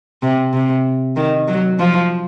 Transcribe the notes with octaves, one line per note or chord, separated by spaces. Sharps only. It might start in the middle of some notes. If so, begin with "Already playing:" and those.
C3
C3
D#3
F#3
F3